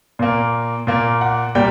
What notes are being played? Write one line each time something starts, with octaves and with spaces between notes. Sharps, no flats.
A#2 A#3
A#2 A#3
F#5
A#2 G3 A#3 G5